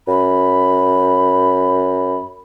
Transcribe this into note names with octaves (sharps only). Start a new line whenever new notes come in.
F#2 B5